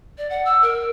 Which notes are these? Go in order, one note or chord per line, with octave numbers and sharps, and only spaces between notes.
D5
F#5
E6
A#4